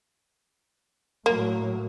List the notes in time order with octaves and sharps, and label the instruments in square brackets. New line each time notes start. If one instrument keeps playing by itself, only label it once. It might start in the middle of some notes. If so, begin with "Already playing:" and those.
[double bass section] A2 F#3 [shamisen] A#3